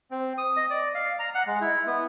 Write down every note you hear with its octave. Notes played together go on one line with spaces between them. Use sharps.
C4
D#6
D#5
D5
F5
A#5
F#5
G#3
E4
B3